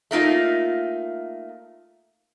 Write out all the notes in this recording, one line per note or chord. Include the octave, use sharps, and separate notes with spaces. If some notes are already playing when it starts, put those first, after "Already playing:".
A3 A#3 D#4 F4